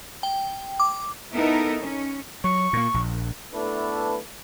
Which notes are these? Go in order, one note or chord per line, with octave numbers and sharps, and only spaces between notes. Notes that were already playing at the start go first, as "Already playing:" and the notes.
G5
D6
B3 D#4 E4 A4 A#4
C#4
F#3 C#6
A#2 A#3
A#1
A3 B3 D4 E4 A4 B4